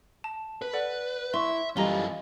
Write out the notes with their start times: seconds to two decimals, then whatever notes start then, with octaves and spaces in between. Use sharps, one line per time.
0.24 A5
0.62 B4
0.73 A4 D5 F#5
1.34 E4 E5 C6 C#6
1.77 F#2 E3 G3 F4 D#5 A#5 G7